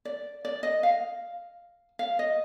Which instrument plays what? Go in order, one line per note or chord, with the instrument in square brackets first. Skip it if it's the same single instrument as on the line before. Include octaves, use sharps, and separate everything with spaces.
[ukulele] D5
D5
D#5
F5
F5
D#5